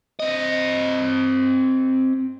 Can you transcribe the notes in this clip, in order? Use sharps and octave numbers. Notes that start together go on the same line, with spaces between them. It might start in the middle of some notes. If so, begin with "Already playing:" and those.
C4 D#5